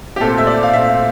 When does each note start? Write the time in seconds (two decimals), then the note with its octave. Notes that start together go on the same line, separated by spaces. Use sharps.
0.16 G4
0.20 A#2 A3 C4 A4
0.38 E5
0.47 D5
0.63 F5
0.73 A#2 A3 C4 E5